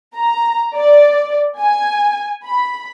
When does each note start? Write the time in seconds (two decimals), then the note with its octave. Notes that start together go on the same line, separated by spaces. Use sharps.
0.16 A#5
0.76 D5
1.60 G#5
2.46 B5